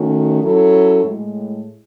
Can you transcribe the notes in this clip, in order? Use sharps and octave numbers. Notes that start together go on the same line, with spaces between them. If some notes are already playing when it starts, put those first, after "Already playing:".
Already playing: D#3 A3 C#4 F#4
F#3 C#4 E4 A4
A2 G#3